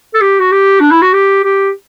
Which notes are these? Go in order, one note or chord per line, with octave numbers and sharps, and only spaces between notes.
A4
G4
F#4
G4
D4
E4
F#4
G4
G4